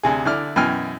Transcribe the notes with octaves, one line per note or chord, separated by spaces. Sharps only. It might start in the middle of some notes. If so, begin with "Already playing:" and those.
D2 C3 G#4
D3 E4 D5 F6
F#2 B2 E3 G5 G#5 F6